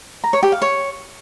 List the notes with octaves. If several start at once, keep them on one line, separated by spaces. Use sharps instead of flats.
A#5
C#5
G4
F5
C#5